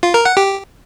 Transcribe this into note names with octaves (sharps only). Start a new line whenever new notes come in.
F4
A#4
F#5
G4